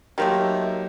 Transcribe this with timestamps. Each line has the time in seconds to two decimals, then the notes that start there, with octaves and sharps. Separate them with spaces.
0.18 D#3 F3 F#3 A3 A#3 G4